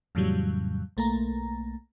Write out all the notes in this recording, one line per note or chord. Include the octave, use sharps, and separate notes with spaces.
F2 A2 C#3 E3 F#3 G3
B1 A3 A#3 A#5